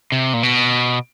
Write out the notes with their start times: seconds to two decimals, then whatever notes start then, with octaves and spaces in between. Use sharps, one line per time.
0.12 C3
0.34 A#2
0.43 B2